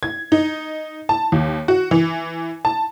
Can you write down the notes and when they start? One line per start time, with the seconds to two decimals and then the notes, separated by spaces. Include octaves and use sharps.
0.03 G#6
0.32 D#4
1.09 A5
1.32 D#2
1.68 F#4
1.91 E3
2.65 A5